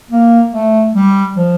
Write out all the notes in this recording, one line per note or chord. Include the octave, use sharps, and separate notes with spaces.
A#3
A3
G3
F3